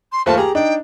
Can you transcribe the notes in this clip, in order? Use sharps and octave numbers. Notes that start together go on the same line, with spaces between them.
C6
D#2 A3 F4 C5 A5
G4 G#4 A#5
D4 D#4 G5